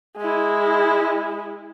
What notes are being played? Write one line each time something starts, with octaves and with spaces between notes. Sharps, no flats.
G#3 E4